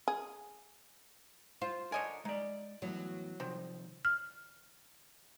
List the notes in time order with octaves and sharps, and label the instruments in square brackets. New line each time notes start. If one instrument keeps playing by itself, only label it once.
[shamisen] G#4
[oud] F4 [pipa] C5
[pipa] D3 D#5 G#5 [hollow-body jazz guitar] A#4 C#5
[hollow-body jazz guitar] G#3 D5 [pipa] D#4
[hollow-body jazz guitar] E2 A2 [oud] F#3
[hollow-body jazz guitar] C3 D#3 F3 [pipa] C4
[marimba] F6